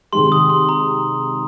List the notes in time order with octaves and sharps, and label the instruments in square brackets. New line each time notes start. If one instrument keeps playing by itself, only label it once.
[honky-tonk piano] C3 D#3 G#3 [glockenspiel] C6
[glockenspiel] D#6
C6
A#5